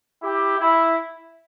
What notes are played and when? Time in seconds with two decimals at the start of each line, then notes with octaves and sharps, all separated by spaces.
0.22 E4 G4
0.58 E4